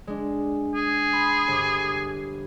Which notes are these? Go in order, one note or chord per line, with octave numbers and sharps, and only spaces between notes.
G#3 D4
G#4
B5 C6
G1 D6